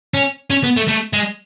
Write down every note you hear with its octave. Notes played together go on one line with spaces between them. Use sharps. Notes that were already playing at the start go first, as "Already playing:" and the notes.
C#4
C#4
B3
A3
A3
G#3